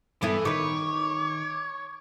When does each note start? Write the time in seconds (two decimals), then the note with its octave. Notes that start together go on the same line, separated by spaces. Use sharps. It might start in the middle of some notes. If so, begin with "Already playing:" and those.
0.22 G2 E3 B3 E4 A4
0.45 D#3 B4 C#5 D6